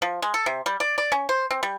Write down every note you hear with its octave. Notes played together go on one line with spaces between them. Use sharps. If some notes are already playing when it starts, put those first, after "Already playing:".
F3
G#3
A4
C3
G3
D5
D5
C#4
C5
C4
G3